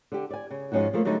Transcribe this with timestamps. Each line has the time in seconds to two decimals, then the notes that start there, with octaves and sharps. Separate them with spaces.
0.12 D3 G4
0.30 D5 G#5
0.51 C#3
0.72 G#2 F3 A3 C#4 D#4 F#4
0.94 F3 A3 A#3
1.05 D3 F#3 G3 A3 D#4